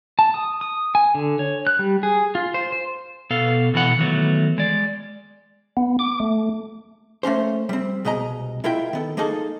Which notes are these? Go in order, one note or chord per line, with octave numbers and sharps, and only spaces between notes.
A5
D#6
D#6
G#5
D3
C#5
F#6
G3
G#4
F4
C5
C5
B2 B3 A4 F5
B2 E3 B3 F#5
D#3 E3 F#3 A3 B3
G#3 D5
B3
D6
A3
A3 A#3 C#4 C5
G3 C4
C2 B2 G#3 D#5 A#5
G#3 E4 F4 A#4 E5 G5
D#3 B3 A4
G#3 A#3 D#4 G#4 A4